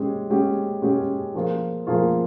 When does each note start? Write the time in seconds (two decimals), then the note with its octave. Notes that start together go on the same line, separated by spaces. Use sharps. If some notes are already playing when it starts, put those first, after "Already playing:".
Already playing: G#3 C#4 G4
0.30 G#3 C#4 G4
0.82 G#3 C#4 G4
1.34 F3 A#3 F4 G#4
1.87 F3 A#3 F4 G#4